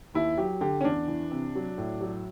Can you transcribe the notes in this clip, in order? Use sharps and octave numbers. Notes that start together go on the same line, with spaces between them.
D#2 E4
F#3 G4
D3 G4
C#4
E2 D4
E3
C3
F#3
A2
F#3